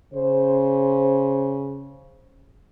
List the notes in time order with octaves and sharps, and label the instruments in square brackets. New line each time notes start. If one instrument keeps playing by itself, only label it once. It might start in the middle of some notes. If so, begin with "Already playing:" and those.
[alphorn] C#3 [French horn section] C5